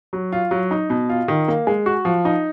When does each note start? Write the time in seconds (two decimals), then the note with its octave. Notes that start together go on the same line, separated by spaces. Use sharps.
0.13 F#3
0.32 F4
0.51 F#3
0.71 D#4
0.90 B2
1.09 F4
1.28 D#3
1.48 A#3
1.67 G#3
1.86 F#4
2.05 F3
2.25 D#4